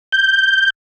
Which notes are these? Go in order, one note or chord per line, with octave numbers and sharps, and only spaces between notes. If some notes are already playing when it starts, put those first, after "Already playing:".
G6